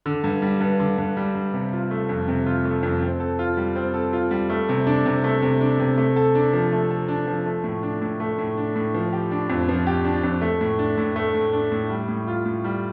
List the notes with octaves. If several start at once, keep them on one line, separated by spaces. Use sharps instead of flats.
D3
G2
G3
G2
D3
G2
G3
G2
C3
F4
A3
F2
C3
F4
A3
F2
C4
A4
F4
G3
C4
A4
F4
G3
A3
C3
D4
C3
A3
C3
D4
C3
A3
A4
D4
F3
A3
A4
D4
F3
A3
A2
D4
A2
A3
A2
D4
A2
F3
G4
D4
F2
F3
G4
D4
F2
A3
A2
D4
A2
A3
A2
D4
A2
G3
A2
F4
A2
G3